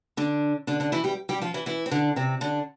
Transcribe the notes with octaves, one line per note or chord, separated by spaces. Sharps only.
D3 D4
D3 D4
D3 D4
E3 E4
G3 G4
G3 G4
F3 F4
E3 E4
E3 E4
C4
D3 D4
C3 C4
D3 D4